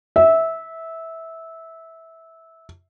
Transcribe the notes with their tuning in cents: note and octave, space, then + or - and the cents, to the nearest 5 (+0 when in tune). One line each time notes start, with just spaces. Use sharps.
E5 -15